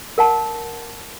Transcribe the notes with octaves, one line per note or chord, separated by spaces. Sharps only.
A#4 F#5 A5